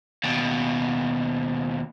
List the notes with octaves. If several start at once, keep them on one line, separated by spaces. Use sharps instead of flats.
D#2 B2